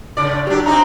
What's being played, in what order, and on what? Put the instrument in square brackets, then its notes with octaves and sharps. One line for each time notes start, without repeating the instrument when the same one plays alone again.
[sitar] A2 C#3 D5
[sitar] F#3 D4 [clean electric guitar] G4
[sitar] C4 D4 D#4 [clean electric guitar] A#5